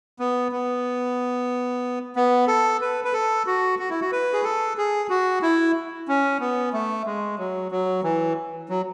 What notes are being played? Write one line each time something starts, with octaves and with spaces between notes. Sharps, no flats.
B3
B3
B3
A4
B4
B4
A4
F#4
F#4
E4
F#4
B4
G#4
A4
G#4
F#4
E4
C#4
B3
A3
G#3
F#3
F#3
E3
F#3